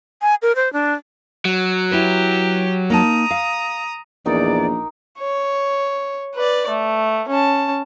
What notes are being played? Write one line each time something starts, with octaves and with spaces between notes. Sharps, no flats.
G#5
A#4
C5
D4
F#3
E4 G4 B4
A#3 D#4 A5 A#5 D#6
F5
A#1 E2 D#4 A#4 D5 D6
C#5
B4 D5
A3
C#4 A5